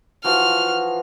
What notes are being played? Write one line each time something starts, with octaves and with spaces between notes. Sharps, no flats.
E3 F3 F#4 F6